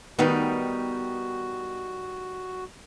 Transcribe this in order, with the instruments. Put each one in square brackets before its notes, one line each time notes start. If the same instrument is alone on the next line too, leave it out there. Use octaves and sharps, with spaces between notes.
[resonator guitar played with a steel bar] D#3 G3 D#4 [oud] B3 [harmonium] F#4